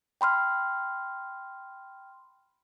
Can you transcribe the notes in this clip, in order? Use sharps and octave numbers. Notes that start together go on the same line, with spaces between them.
G5 B5 C6 F6